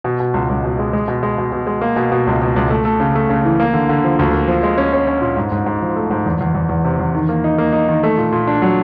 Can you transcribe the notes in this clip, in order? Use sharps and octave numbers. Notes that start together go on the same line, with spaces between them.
B2
B2
C#2
C#2
B2
G#3
G#3
B2
G#3
B2
B2
G#3
A#3
B2
B2
C#2
B2
C#2
A3
A3
C#3
A3
C#3
E3
A#3
D3
D3
F3
D2
A#3
F3
G#3
C#4
C#4
C#4
A#2
G#2
G#2
G#2
F3
A3
G#2
E2
E2
E2
E2
C3
E2
D#3
A#3
D#4
A#3
D#4
D#3
A3
A#2
A#2
D4
F#3